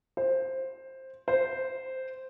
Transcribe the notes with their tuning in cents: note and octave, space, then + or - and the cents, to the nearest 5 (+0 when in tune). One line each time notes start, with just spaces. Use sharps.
C5 +10
C5 -5